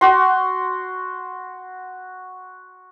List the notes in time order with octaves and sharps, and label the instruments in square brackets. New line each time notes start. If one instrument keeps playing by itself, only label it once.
[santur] F#4 C6